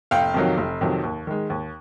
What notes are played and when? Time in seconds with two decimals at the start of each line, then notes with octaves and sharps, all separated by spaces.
0.11 F1 F5 G5
0.34 F2 C3 D#3 F#3
0.58 F1
0.81 F2 C3 D#3 F#3
1.04 D#2
1.27 D#3 G#3
1.50 D#2